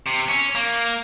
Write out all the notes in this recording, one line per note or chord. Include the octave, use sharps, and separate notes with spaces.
C3
C#4
A#3